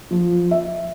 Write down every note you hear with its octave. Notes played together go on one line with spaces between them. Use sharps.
F3
E5